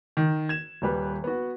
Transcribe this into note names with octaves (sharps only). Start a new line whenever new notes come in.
D#3
G#6 E7
D#1 G3 B4
B3 F#4